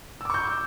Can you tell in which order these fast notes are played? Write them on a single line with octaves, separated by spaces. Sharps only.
E6 D6 C#6 G6